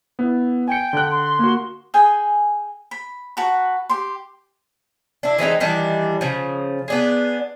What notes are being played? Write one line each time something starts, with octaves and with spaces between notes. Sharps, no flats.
B3 E4
G5 G#5 C#7
D3 F#6
C6
A#3 F#4
G#4 G5 G#5
B5
F#4 B4 A5 A#5
G4 C6
D4 E4
E3 G#3 C4 D#4
D#3 E3 G3 D4
C#3 F3
B3 D4 G#4